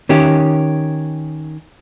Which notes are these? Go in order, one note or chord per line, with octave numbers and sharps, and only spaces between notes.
D#3 C#4 G4